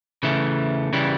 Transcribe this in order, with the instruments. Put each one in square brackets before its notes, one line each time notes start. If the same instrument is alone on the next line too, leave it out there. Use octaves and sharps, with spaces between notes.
[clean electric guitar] C#3 E3 A3
C#3 E3 G3